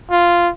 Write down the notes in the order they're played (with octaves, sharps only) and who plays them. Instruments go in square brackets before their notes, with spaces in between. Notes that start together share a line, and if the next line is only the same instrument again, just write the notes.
[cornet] F4